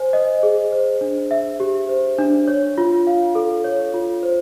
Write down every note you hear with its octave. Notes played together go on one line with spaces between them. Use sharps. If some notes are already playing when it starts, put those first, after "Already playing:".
Already playing: C5 G#5
D#5
G#4
C5
D4
E5
G4
C5
D4
C#5
F4
F5
A4
C#5
F4
C5